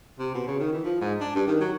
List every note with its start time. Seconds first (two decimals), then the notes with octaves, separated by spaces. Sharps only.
0.19 C3
0.35 B2
0.48 C#3
0.60 D#3
0.72 E3
0.85 F3
1.01 G#2
1.21 D4
1.35 G2
1.47 D#3
1.60 F#3